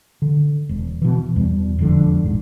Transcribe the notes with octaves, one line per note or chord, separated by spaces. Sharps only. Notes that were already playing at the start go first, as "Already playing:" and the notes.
D3
E1
B2 E3
E2 G3
E1 B1 F2 D3
A1 G#2